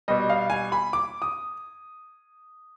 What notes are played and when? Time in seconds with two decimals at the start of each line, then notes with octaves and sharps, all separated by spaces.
0.08 B2 G3 D#5
0.29 F5
0.50 G#5
0.72 B5
0.93 D6
1.22 D#6